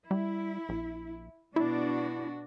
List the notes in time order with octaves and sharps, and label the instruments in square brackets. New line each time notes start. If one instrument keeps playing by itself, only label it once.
[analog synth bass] G3 [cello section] E4
[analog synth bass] A#1
[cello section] B2 D4 F#4 [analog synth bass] E4